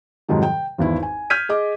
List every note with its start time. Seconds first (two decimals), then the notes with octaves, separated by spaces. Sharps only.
0.28 F2 G#2 C3 D#3 F#3 G3
0.43 G5
0.78 G#1 E2 E4
1.03 G#5
1.30 F6 G6 G#6 B6 D#7
1.49 G#4 D#5 D6